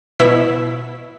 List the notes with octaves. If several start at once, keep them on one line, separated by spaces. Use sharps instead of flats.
B2 E4 B6